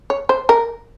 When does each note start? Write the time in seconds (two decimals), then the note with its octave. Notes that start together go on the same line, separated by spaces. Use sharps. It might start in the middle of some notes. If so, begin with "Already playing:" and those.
0.10 C#5
0.29 C5
0.49 A#4